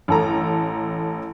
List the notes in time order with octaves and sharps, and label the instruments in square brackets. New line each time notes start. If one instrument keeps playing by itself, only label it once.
[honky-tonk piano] A1 A4 A#5